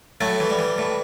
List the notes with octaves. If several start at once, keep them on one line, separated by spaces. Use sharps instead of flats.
A2 F#3 A3
E3
G3
E3
A2